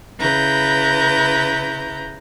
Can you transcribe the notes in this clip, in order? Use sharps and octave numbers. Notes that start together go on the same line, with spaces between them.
C#3 E4 B4 A#5 G6